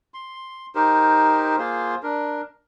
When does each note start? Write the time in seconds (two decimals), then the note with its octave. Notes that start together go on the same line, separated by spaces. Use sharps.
0.14 C6
0.75 D#4 G4 A#4 C5
1.58 A#3 F4 G#4 C5
2.03 D4 A#4